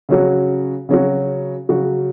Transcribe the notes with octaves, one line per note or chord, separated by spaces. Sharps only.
C#3 F#3 C#4 F#4
C#3 F#3 C#4 F#4
C#3 F#3 C#4 F#4